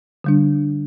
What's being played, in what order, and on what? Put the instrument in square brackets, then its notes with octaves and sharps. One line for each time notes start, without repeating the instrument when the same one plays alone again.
[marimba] D3 G3 D4